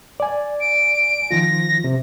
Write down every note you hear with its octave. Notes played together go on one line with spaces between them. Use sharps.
D5 G#5
D7
D#3 F3 F4 A#6
C3